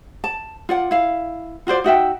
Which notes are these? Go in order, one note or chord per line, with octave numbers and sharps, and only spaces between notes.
A5
F4 D5 F#5
E4 F5
F4 F#4 C5 D5
D#4 F#4 E5 G5